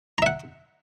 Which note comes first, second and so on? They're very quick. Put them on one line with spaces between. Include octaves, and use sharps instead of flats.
A#5 E5 F#5